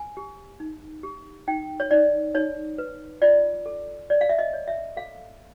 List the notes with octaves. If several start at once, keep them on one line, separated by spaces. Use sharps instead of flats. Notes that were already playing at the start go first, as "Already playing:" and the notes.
Already playing: G#5
G4
D#4
G4
D#4 G5
C#5
D#4 D5
D#4 C#5
B4
F4 D5
A4
C#5 D5
F5
E5
D#5
C#5
E5
A4 F5